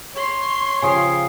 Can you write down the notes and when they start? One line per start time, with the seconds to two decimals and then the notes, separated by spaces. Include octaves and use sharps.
0.16 C#5 C6
0.82 C#3 F3 G4 G#5 D#6 C7